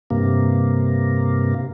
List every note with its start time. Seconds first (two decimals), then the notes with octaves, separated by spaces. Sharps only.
0.11 G2 C3 A#3